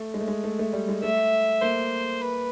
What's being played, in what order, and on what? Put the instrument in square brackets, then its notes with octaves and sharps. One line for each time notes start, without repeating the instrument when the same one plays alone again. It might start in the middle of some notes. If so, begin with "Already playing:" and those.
Already playing: [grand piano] A3
G#3
A3
G#3
A3
A3
G3
G#3
[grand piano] A3 [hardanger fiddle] E5
[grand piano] A#3 [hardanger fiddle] C5
[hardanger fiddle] B4